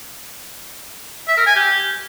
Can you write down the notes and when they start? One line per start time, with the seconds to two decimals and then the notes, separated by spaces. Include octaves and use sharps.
1.28 E5
1.37 A#4
1.46 G#5
1.56 G4